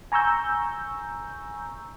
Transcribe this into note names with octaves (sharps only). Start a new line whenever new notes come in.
G#5 A#5 C#6 E6 G6